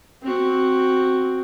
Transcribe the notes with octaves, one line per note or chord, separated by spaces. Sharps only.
C4 F#4